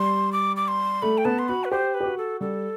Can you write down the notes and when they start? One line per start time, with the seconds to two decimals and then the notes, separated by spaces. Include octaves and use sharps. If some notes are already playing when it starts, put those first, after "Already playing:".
Already playing: G3 C6
0.32 D6
0.56 D6
0.68 C6
1.02 A3 B5
1.18 G5
1.25 B3 A5
1.39 C6
1.48 F#4 B5
1.64 B4
1.71 G4 C5
1.94 B4
2.00 G4
2.06 F#4
2.18 A4
2.41 G3 A4